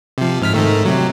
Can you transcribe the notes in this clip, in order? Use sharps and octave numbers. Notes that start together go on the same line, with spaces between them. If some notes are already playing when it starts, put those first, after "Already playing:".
C3 F3
G#2 F6 B6
G#2 D#3 A3
C3 F#3